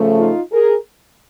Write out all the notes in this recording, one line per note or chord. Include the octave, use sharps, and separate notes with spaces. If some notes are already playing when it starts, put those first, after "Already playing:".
Already playing: C#3 F3 A3
D#4 F4
G#4 A#4